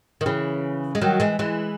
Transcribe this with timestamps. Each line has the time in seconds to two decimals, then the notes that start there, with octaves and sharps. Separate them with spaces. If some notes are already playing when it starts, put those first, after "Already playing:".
0.21 D#3
0.26 C#3 E3
0.95 G#3
1.01 D#3 F#3
1.20 E3 G#3
1.39 E3 G#3